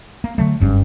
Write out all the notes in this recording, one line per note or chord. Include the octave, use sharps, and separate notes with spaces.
A#3
D3 F#3 A3
F#1 G2 C#4